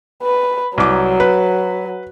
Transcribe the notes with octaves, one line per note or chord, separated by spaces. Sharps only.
B4
C2 F#3 D6
B4